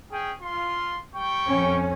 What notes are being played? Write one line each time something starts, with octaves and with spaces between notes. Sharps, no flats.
C#4 G#4 G5
F4 C6
G3 G5 C#6
F2 C#4